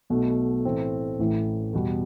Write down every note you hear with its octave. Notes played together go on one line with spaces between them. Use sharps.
B1 B2 A3
A2 E3 A3 C4
A1 A2 E3
E2 B2 G3 B3